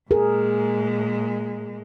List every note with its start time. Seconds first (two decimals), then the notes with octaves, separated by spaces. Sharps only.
0.11 A#2 G#3 G#4 A#4